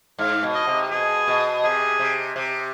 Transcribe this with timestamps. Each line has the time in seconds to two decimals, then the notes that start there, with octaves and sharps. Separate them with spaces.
0.18 G#2 F5
0.43 B2
0.55 D#5
0.67 C3
0.91 B2 G#4
1.27 B2
1.64 C3 G#4
1.99 C3
2.36 C3